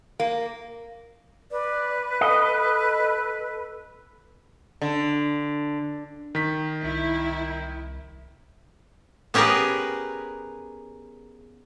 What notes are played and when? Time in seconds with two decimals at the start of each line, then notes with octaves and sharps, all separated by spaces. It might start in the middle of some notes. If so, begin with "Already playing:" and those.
0.20 A#3
1.51 B4 D5
2.21 A4 D#5
4.82 D3
6.35 D#3 B6
6.84 C2 E4
9.34 B3 C#4 G4 G#4 A#4 B4